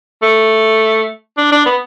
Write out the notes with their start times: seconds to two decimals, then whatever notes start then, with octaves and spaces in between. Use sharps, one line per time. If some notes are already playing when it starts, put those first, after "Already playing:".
0.22 A3
1.38 D4
1.52 D4
1.66 B3